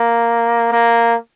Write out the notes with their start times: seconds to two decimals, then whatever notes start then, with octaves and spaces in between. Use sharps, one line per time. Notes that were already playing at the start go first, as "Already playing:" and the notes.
Already playing: A#3
0.72 A#3